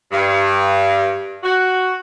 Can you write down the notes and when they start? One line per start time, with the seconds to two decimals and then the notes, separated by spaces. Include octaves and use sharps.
0.12 G2
1.44 F#4